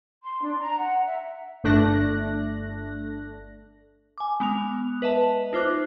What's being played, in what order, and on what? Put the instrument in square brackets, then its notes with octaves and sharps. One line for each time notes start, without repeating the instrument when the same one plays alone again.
[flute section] C6
D4
A#5
F#5
E5
[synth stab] G1 A3 D4 F#6 A#6
[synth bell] G#5 D6
G#3 B3 F#6 F7
B4 D#5 E5 A5
D#4 F4 C5 D6 F#6